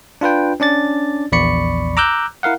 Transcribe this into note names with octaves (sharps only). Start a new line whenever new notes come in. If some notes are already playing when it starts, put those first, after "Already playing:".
D4 F4 B4 G5
C#4 D4 D5 A6
A#1 E2 D5 B5 C#6 C#7
A#5 D6 E6 F#6 G6
E4 A#4 F5 F#5